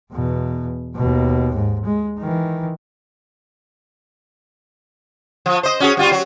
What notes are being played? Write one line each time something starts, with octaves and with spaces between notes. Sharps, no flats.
E2 B2
D#2 B2
G#2
G#3
D#3 E3
F3
C5 D#5
C#4 F#4 G#4
G3 F4 F#4
F#3